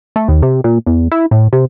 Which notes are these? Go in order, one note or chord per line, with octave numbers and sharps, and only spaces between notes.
A3
D#2
C3
A#2
E2
E4
A2
C3